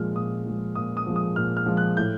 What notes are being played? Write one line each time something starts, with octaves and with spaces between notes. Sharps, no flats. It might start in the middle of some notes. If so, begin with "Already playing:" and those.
Already playing: A#2 F3 G#3 F6
A#2 D#6
F3 G#3
A#2 D#6
D#6
F3 G#3
D#6
A#2 F6
F6
F3 G#3
F#6
A2 G6